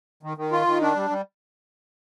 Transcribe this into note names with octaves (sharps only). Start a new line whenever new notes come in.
D#3
D#3
F4
D#3
D4
G3
G3